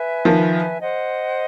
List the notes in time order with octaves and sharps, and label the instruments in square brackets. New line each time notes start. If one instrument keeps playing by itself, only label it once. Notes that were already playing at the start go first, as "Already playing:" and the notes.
Already playing: [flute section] B4 E5 G#5
[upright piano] D#3 F3
[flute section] C5 D#5 F#5